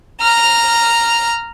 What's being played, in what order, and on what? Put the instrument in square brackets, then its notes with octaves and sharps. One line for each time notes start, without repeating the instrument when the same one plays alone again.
[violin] A#5 F6